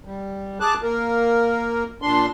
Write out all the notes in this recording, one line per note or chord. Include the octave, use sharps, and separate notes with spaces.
G3
G#4 A5 D6 F#6
A#3 A#4
A#2 D4 C6